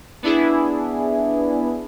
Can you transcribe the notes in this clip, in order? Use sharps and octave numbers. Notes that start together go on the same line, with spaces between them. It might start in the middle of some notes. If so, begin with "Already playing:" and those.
B3 D4 E4 G#4